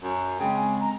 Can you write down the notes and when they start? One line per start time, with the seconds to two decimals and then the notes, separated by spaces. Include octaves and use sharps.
0.03 F#2
0.40 C#3 G#3 C4 G5
0.56 G#5
0.80 A#5